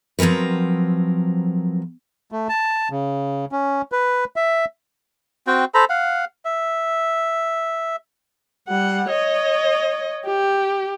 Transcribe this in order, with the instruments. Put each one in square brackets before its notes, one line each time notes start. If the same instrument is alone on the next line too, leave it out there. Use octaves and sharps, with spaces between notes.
[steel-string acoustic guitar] F3 F#3 C4 A#4 B4
[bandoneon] A3
A5
C#3
C#4
B4
E5
[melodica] C4 F#4 G5
A4 C5 A#5 B5
F5 F#5
E5
[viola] G3 F#5
C#5 D#5
G4